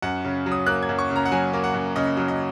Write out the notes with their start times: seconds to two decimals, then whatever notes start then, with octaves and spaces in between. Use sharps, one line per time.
0.02 F#2 F#5
0.25 C#3
0.46 F#3
0.52 D#6
0.66 A#3 F#6
0.83 G#6
0.89 F#2
0.99 C#6
1.10 C#3
1.16 A#5
1.25 F#5
1.31 F#3 G#5
1.53 A#3
1.64 F#5
1.74 F#2
1.96 C#3 D#5
2.17 F#3
2.28 D#5